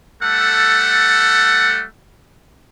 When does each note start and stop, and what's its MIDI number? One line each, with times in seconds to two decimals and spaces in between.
0.23 1.86 55
0.23 1.86 57
0.23 1.86 69
0.23 1.86 78